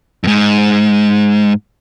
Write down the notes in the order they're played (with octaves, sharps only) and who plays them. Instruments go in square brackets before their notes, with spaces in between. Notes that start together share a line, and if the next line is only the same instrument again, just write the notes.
[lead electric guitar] F2 G#2